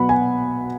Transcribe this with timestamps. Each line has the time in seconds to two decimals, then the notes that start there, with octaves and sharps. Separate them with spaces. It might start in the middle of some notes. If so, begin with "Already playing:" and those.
Already playing: B2 F#3 B3 F#5 B5
0.09 G#5